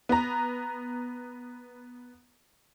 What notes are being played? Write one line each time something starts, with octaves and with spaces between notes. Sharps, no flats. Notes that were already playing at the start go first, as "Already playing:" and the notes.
B3 A#5